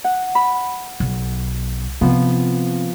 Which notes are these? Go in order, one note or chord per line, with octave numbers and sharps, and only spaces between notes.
F#5
B5
B1
C3 F3 B3